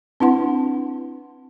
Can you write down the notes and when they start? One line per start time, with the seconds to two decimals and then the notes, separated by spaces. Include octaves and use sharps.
0.20 C4 D4 E4 B4 F#5 C6